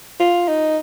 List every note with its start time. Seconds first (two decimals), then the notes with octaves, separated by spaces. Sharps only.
0.20 F4
0.48 D#4